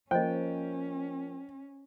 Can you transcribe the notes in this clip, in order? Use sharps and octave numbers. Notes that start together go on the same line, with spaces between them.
F3 A#3 C#4 C5 D#5 G5